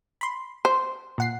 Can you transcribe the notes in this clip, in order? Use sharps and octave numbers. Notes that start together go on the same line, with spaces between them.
B5 C6
C5
A#2 F#5 C7